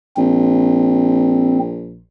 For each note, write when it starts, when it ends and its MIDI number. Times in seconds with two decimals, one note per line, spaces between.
0.17 2.06 34
0.17 1.59 60